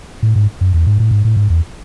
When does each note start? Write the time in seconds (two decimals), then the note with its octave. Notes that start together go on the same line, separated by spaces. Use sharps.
0.23 A2
0.36 G#2
0.61 F#2
0.74 E2
0.86 G#2
1.00 A2
1.11 G#2
1.25 A2
1.37 G#2
1.50 E2